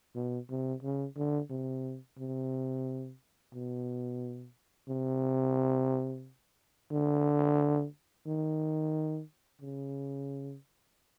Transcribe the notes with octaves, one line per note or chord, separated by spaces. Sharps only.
B2
C3
C#3
D3
C3
C3
B2
C3
D3
D#3
C#3